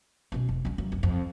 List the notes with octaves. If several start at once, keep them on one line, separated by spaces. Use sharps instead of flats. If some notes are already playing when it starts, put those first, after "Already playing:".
B2 C#4
F1
G#3 C#4
F#2
F#1
F2